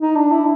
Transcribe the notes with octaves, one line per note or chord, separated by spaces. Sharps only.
D#4
D4
E4